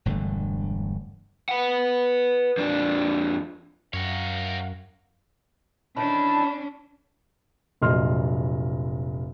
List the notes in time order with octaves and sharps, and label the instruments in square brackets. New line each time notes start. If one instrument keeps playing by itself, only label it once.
[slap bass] E1 G2 D3 A3
[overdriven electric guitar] B4 F#5
F2 D4
[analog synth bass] F#2 [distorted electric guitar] A#4 C#5 [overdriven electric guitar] F5 F#5
[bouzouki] D#3 E3 E4 [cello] C#4 D4 [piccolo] A5
[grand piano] F1 A#1 F#3 D#5 C6 F6